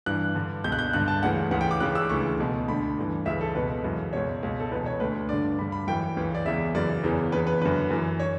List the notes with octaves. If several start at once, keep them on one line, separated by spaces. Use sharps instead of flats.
G2 E3 F#6
G2 D3
C#2 B2 G6
F#6
G6
G2 D3 F#6
A5
D2 C#3 E3 F#5
C#2 C#3 E3 F#5
G5
D6
C#2 C#3 E3 F#6
E6
D2 C#3 E3 C#6
C#2 B2
D2 D3 B5
G2 E3
C#2 C#3 E3 E5
A4
C#2 B2 B4
F#2 C#3 E3
C#2 B2 C#5
C#2 B2
A4
E2 B2 B4
C#5
D2 D3 B4
G2 D3 D5
G2 D3 B5
B5
F#2 E3 G5
C#2 C#3 E3
D5
E2 C#3 E3 E5
F#2 C#3 E3 D5
E2 C#3 E3
E2 C#3 E3 B4
B4
F#2 D3 B4
F#2 E3
C#5